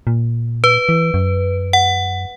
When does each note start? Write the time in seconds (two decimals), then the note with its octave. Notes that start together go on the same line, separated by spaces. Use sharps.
0.07 A#2
0.64 B4
0.89 E3
1.14 F#2
1.73 F#5